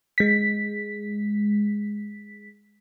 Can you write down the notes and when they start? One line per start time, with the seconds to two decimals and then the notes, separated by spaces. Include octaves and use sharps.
0.18 G#3 B6